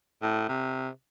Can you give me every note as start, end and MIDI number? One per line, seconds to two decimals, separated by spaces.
0.22 0.48 45
0.49 0.89 48